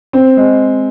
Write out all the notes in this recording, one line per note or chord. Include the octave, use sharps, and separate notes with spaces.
C4
G#3